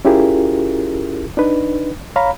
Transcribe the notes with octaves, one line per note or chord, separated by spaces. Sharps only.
C#4 E4 F4 G4 G#4 A#4
D4 D#4 B4
C#5 F5 A#5 B5